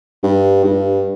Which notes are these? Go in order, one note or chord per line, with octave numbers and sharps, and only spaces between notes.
G2
G2